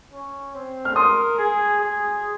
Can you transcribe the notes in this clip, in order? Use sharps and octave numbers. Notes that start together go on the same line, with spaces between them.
C#4
C4
F6
A#4 C6 D#6
G#4
G#4